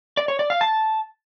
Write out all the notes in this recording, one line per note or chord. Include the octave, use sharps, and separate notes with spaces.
D5
C#5
D5
F5
A5